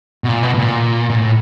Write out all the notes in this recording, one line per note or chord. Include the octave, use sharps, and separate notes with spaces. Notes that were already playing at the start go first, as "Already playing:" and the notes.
B2
A#2
B2
B2
A#2
A#2
A2